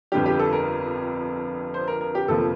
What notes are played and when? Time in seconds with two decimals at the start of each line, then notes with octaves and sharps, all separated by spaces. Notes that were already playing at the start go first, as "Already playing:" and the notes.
0.12 G1 F2 D3 G3 G4
0.26 G4
0.39 A4
0.53 A#4
1.74 C5
1.88 A#4
2.01 A#4
2.15 G4
2.28 G1 F2 C3 F3 A#3 A4